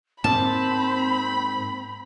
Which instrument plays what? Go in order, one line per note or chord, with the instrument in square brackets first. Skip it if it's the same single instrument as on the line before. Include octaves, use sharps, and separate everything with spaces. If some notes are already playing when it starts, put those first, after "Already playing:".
[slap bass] G#2 A#3 [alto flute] C4 [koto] A5 [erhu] B5